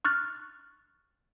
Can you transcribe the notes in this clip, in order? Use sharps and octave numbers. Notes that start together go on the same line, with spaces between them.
C#6 F6 F#6 A6